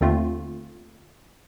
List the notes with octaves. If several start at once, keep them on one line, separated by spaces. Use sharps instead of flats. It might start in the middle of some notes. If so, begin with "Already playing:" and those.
D#2 D3 A3 C4 F4